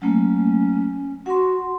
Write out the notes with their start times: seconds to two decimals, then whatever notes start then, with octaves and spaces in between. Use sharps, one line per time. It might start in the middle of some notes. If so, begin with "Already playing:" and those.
0.02 F#3 A3 A#3 C#4
1.26 F#4 F#5 C6